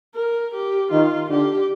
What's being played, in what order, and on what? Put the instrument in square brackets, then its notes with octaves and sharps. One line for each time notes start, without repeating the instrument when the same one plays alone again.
[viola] A#4
G4
[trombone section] D#3 [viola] F4
[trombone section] D3 [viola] G4